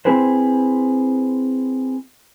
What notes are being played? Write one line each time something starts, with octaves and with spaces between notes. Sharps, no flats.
C4 E4 G#4 B4 C5